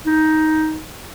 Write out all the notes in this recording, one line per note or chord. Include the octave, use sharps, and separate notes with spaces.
D#4